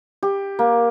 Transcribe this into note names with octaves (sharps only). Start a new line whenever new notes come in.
G4
A#3